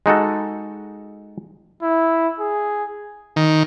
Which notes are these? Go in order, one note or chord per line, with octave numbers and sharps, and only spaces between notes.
G#3 D#4 F#4 A4
E4
G#4
D#3